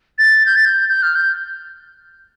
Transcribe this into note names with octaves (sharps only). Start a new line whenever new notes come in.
A6
G6
A6
G6
G6
F6
G6